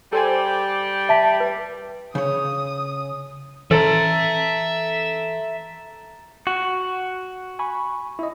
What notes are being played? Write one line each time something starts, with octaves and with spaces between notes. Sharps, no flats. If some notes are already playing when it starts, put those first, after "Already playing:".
G3 G4 A4 C5 G#5
E5 A5 B6
B4
C#3 C#5 D#6
E3 A4 E5 A#5 C6 A6 F#7
F#4
G#5 B5 C#6
E4 D#5